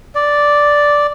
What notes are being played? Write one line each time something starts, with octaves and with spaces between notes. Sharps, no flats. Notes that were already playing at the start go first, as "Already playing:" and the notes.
D5